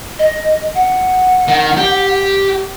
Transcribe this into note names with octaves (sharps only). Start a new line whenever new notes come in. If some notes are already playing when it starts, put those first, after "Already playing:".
D#5
F#5
D#3
G4